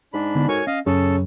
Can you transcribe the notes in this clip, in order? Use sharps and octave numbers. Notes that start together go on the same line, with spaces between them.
G#2 D4 B5
D3 B3 E4
F#4 A4 A#4 C#5 G#5 C#6
C#4 D#5 F5
F#2 C#3 A4